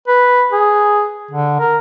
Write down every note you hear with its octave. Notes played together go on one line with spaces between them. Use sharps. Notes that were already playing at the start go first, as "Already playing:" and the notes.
B4
G#4
D3
A#4